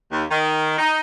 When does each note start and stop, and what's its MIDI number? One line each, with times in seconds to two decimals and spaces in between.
0.12 0.24 39
0.30 0.75 51
0.78 1.00 63